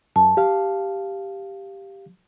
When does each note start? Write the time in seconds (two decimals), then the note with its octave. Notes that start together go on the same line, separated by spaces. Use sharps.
0.16 F#2 A5
0.37 G4 F5